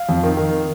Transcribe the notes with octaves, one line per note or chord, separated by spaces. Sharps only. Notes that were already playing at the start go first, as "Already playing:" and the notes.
Already playing: F5
F2
D#3
D#3